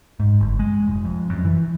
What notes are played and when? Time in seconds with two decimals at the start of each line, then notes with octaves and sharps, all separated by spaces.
0.20 G#2
0.40 G1
0.59 G#3
0.88 F1
1.05 F2
1.30 F#2
1.45 E3